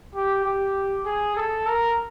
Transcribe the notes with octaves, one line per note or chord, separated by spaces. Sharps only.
G4
G4
G#4
A4
A#4